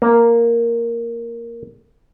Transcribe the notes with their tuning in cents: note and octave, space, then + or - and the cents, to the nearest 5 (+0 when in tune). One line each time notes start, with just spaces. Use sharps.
A#3 +0